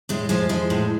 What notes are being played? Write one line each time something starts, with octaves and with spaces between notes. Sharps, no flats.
A2 G#3
F3 G#3
F3 G#3
A2